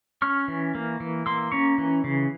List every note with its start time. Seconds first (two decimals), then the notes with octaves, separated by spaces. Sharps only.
0.22 C#4 C#6 F6
0.48 E3
0.75 A#3
1.00 E3
1.26 A#3 C6 E6
1.52 C#4 A#5 C#6
1.78 E3
2.04 C#3